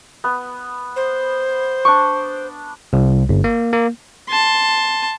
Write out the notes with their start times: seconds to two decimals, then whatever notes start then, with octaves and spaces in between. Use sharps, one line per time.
0.24 B3
0.96 C5
1.85 D4 C#6 D6
2.93 C2
3.29 G1
3.44 A#3
3.73 A#3
4.29 A5 C6